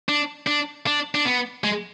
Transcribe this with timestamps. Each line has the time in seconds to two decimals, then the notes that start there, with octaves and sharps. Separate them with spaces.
0.09 D4
0.47 D4
0.87 D4
1.15 D4
1.25 B3
1.64 G#3